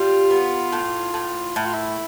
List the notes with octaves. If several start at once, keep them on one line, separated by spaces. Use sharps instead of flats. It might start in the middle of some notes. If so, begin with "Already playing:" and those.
Already playing: G3 F4
B3
A2
A2
A2 E4
F4
E4